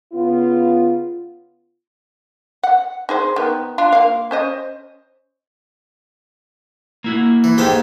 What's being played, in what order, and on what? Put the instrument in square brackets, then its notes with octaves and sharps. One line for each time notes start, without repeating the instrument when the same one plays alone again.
[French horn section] C#3 B3 F4
[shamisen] F#5
D#4 G#4 C5
D#3 B3
D4 F4
A#3 F5
C#4 C5 D#5
[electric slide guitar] A#3 E4 F#4
[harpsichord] E3
[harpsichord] G#2 A#3 G#5 [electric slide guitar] G4 A4 G5